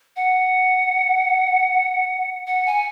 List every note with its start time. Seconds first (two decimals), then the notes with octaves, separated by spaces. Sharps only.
0.16 F#5
2.47 F#5
2.66 G#5